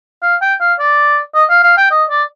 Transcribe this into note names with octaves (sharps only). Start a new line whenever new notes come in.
F5
G5
F5
D5
D#5
F5
F5
G5
D#5
D5